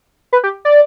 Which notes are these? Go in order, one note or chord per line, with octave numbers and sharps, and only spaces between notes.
B4
G4
D5